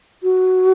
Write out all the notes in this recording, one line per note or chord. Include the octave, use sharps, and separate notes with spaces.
F#4